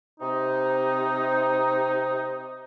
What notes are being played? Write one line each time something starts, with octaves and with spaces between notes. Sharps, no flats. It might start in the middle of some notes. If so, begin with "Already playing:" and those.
C3 D#4